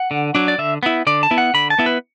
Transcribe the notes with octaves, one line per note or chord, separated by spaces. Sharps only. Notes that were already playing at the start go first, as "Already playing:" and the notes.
Already playing: F#5
D3
F#3 D4
D5
D3 E5
B3 E4
D3 D5
A5
B3 E4
F#5
D3 B5
A5
B3 E4
B4